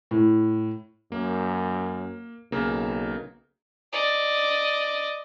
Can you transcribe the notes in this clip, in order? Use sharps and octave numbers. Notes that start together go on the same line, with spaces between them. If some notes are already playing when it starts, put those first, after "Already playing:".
A2
F#2 A#3
B1 C#3 A#3
D5 D#5